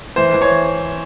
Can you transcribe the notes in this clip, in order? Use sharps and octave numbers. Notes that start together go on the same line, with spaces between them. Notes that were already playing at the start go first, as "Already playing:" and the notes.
E3 C5
E3
C#5